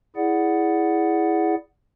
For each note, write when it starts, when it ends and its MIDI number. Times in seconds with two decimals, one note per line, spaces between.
0.16 1.55 64
0.16 1.55 68
0.16 1.55 74
0.16 1.55 78